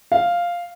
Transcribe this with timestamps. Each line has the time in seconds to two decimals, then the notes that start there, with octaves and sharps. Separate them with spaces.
0.12 F5